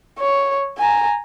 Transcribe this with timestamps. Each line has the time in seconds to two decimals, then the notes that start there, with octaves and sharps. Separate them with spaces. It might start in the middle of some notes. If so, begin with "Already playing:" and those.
0.19 C#5
0.78 G#5 A#5